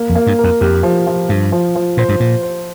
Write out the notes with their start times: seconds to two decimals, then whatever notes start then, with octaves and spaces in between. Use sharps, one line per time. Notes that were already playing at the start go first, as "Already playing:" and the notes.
Already playing: A#3
0.09 F2
0.15 A#3
0.27 G2
0.39 F2 A#4
0.61 F2 G4
0.83 F3
1.07 F3
1.29 G2 F3
1.52 F3
1.75 F3
1.97 A#2 C5
2.09 G2
2.20 A#2 C5
2.43 C5